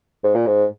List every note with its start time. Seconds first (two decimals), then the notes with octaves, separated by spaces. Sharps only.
0.24 G#2
0.35 A#2
0.46 G#2